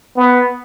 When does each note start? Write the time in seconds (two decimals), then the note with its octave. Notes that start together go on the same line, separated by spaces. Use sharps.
0.17 B3